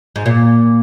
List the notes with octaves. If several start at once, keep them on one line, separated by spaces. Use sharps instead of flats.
G#2
A#2